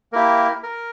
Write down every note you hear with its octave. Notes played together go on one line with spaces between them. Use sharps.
A#3 E4 G4 A#4
A#4